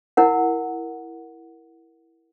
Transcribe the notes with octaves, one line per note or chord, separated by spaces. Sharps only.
E4 A#4 F#5